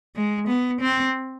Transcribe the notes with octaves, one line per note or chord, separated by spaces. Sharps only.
G#3
B3
C4